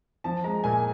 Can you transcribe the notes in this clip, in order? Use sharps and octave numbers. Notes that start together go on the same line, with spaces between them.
F3 A5
G#3 A#5
A#2 G#5